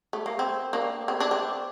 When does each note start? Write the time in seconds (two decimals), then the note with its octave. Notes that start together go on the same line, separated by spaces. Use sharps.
0.13 A3
0.26 A#3
0.39 C4
0.73 A#3 D4
1.08 C4
1.20 D4
1.31 C4